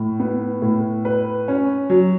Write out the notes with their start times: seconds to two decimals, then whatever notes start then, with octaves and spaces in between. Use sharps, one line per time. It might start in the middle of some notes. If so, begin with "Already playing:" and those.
Already playing: A2
0.20 B3
0.62 A2
1.05 B4
1.48 C#4
1.90 F#3